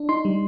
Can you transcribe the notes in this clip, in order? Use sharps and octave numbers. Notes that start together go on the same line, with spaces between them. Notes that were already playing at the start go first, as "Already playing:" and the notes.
Already playing: D4
D#4 C6
G3